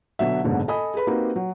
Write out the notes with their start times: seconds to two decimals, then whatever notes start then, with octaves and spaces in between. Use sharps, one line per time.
0.19 B2 D3 F#3 E5
0.44 F#1 G#2 B2 D3
0.68 A4 D#5 G#5 B5 D#6
0.94 G#4 A4 B4 B5
1.07 A#3 C4 D#4 F#4 G4 B4
1.36 F#3